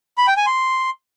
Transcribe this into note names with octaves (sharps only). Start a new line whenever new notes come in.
B5
G5
G#5
C6